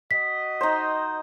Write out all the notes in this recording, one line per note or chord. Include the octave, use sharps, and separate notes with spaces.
F#4 D#5 B6
D#4 C5